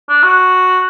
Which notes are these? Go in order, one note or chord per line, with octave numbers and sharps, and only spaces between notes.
D4
F#4